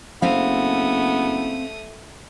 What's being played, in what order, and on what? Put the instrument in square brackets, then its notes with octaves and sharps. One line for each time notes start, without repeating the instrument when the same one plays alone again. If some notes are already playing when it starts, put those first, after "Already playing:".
[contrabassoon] F#1 [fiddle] A3 D#6 [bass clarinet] B3 [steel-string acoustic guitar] C4 F5